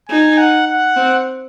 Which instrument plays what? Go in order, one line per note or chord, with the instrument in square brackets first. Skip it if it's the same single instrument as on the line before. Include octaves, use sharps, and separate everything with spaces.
[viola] D#4 [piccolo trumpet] G#5
[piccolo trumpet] F#5
F#5
[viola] C4